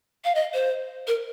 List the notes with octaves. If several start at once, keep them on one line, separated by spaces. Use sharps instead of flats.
F5
D#5
C5
A#4